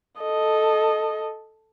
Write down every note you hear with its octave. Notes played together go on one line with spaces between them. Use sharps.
A4 D#5